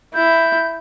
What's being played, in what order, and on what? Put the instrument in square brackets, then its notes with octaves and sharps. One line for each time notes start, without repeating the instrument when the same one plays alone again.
[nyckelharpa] E4 [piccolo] G6